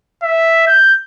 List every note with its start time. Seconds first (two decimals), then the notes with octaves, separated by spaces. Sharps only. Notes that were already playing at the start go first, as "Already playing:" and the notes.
0.23 E5
0.67 G6